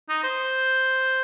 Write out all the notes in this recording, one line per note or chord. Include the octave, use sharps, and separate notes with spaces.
D#4
C5